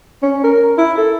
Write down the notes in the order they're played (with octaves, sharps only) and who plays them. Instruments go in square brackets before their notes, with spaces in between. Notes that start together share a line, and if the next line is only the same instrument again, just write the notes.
[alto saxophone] C#4
A#4
E4
A4